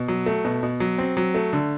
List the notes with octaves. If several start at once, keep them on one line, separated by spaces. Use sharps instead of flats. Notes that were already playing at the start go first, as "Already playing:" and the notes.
Already playing: B2
F#3
A3
B2
B2
F#3
C4
F#3
A3
D3